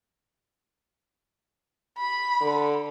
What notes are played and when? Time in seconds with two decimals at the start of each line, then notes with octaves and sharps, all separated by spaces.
1.97 B5
2.41 D3